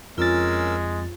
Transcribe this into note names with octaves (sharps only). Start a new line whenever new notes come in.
F2 G#3 C#4 F4 A#4 E6 A6